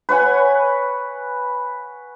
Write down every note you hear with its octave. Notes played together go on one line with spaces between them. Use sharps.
B4 C#5 F#5 G#5